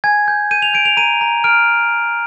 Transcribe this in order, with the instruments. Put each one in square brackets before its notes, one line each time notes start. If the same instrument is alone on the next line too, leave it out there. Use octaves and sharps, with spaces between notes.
[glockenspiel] G#5 G#6
G6
G6 D#7
F7
G6 D7
F7
A#5 D#7
A#5
F6 D7